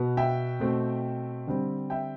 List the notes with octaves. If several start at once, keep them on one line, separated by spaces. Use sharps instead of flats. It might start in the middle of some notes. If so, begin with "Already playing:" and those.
Already playing: B2 B3
E5 G5
B2 A3 C4
D3 G3 C4
E5 G5